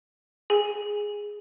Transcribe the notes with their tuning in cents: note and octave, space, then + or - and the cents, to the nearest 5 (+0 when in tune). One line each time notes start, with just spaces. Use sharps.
G#4 +0 G#5 -10